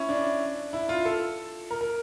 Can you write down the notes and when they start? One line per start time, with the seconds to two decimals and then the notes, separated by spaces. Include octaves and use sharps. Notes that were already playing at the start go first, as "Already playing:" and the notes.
Already playing: C#4 E4
0.09 D4
0.73 E4
0.89 F4
1.05 A4
1.71 A#4
1.81 A#4